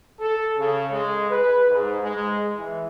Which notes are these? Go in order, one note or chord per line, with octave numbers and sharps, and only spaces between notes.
A4
C#3
G#3
B4
G#2
G#3
E3